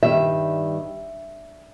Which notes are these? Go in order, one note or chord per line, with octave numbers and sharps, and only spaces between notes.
G2 D#3 G3 E5